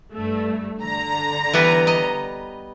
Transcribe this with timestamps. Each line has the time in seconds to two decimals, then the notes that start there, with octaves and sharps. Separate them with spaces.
0.13 G2 A3
0.81 D3 A#5
1.53 E3 G3 B3
1.87 D#5